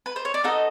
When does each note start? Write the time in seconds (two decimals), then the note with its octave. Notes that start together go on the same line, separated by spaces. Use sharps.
0.06 B4
0.16 C5
0.25 C#5
0.34 D5
0.43 B3 D#4 F#4 A4 D#5